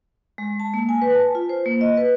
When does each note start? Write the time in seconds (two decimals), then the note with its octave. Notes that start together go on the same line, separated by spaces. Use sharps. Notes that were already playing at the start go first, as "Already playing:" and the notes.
0.38 G#3
0.60 A5
0.74 A#3
0.89 G#5
1.02 B4
1.15 A5
1.35 F4
1.49 C5
1.66 A#3
1.81 D#5
1.97 B4